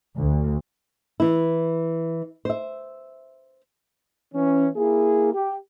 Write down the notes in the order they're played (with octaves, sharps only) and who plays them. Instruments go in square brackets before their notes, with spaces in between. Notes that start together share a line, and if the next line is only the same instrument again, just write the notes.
[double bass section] D2
[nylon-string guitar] E3 E4
C5 E5
[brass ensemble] E3 C#4
A#3 E4 G#4
G4